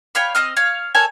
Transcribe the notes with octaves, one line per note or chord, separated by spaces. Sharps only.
G4 C#5 F5 B5
C4 D#5 D#6 F6
C#5 F5
A4 A#4 C#5 G#5